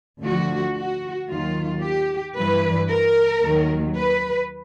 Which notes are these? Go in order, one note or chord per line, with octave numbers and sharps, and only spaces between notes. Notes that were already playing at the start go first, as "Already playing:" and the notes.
D2 D3 F3 F#4
F#4
D#2 D#3 F#3 F4
G4
G2 E3 B4
A#4
D#2 D#3 F#3
B4